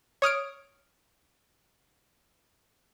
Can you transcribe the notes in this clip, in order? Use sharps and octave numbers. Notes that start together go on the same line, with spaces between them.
C#5 D#6 F6 D7